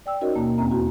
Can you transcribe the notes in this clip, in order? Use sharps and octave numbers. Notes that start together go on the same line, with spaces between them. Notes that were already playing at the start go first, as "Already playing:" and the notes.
D5 G5 E6
C#4 D#4 F#4 A#4 C#5 D#5
D#2 B2 A#3 A5 A#5
E2 C4 C#4 E5 A#5
E4 F#4